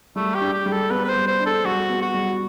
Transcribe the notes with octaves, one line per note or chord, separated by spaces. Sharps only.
G3 A3
G4
D4
G4
G3
A4
B3 B4
B4
C5
G3
C5
D4
A4
G3 F#4
B3
F#4
G3